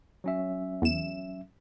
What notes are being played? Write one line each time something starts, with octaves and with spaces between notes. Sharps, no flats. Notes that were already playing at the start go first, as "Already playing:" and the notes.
F#3 C#4 E5
E2 E7